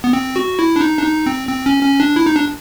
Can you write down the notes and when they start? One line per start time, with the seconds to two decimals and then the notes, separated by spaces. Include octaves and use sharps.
0.04 B3
0.13 C4
0.36 F#4
0.59 E4
0.76 D4
0.81 D#4
0.98 D4
1.04 D#4
1.26 C4
1.49 C4
1.66 C#4
1.83 C#4
2.00 D4
2.16 E4
2.26 D#4
2.36 D4